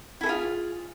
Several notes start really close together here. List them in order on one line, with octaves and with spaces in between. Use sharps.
E4 A4 G#4 F4